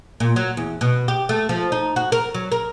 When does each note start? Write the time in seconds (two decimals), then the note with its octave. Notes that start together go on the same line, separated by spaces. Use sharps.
0.20 A#2
0.36 F#3
0.57 E2
0.81 B2
1.08 G4
1.29 A3
1.49 F3
1.72 D#4
1.96 F#4
2.12 A#4
2.34 F#3
2.52 A#4